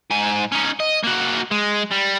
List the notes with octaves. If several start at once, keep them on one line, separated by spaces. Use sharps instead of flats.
G#2 G#5
C#4 D#4
D#5
A#3 F#4
G#3
G3